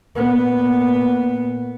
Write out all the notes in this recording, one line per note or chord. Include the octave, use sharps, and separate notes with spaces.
A#2 B3